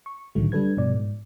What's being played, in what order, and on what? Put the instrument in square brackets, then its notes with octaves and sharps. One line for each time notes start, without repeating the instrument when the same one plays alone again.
[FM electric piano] C#6
B1 A2 D3 D#3 F#3 A3
G3 D4 A4 B4 G#6
G2 B2 F3 D5
G#2